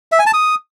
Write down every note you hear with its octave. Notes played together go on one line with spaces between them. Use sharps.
E5
G#5
A5
D#6